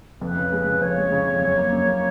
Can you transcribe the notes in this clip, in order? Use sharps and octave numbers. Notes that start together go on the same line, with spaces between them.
F2 B4
C#3
G#3
C#3
F2 C#5
G#3
C#3
F2
F#2
A#3
F#2
A#3